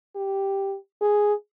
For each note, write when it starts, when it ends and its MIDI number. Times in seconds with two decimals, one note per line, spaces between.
0.16 0.76 67
1.01 1.34 68